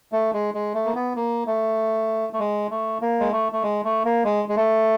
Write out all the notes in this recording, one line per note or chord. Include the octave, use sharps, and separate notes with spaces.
A3
G#3
G#3
A3
A#3
B3
A#3
A3
A3
G#3
A3
A#3
G#3
A3
A3
G#3
A3
A#3
G#3
G#3
A3